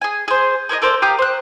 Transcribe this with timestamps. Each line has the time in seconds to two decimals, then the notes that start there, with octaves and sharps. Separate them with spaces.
0.01 G#4 G#5
0.28 G#4 C5
0.69 G#4 A#4 C#5 D#5
0.82 A4 A#4 C5 D5
1.02 G4 F5 A#5 D#6
1.19 C5 F#6